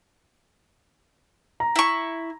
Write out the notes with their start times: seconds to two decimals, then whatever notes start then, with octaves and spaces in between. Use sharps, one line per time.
1.60 A#5
1.76 E4 C#6